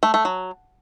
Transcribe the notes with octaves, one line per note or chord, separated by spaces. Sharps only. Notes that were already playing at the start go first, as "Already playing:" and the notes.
A3
A3
F#3